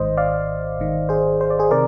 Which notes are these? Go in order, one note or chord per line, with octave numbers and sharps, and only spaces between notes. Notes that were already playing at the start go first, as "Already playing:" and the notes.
Already playing: G#1 G#2 D#3 C5 D#5
D5 F5
G#1 G#2 D#3
G#4 C5
C5
D5
G#4 C5
C3 D#3 A#4 D5